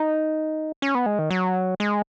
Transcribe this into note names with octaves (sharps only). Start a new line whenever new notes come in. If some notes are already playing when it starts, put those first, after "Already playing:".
Already playing: D#4
C#4
B3
G#3
D#3
F#3
G#3